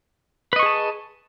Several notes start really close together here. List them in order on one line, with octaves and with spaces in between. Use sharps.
B4 D#5 C#6 G#4 A5